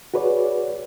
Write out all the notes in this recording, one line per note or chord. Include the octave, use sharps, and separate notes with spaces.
F#4 G#4 B4 C#5 D5